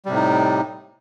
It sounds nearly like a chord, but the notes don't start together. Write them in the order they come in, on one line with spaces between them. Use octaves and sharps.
G3 C3 A2 D#4